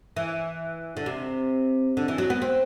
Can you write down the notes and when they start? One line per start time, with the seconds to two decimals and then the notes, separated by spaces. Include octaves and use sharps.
0.16 E3
0.97 D3
1.06 C3
1.97 D3
2.08 E3
2.18 F#3
2.30 B3
2.42 C4